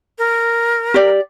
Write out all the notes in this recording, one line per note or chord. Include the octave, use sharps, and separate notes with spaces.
A#4
G4 D5